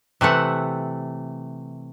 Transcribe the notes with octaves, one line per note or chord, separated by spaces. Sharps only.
C3 E3 A3 F#5